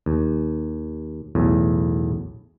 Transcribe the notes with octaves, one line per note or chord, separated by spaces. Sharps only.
D#2
B1 E2 A2